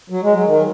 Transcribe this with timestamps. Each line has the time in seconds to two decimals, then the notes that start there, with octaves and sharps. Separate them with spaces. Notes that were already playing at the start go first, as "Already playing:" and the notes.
0.10 F#3
0.23 G#3
0.34 F#3
0.46 D#3